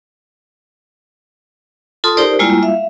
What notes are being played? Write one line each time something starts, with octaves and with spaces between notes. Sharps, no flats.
F4 A4 A5 C6 D#6
D#4 G4 A#4 C5 D5
G3 G#3 A#3 E4 F4
E5 F5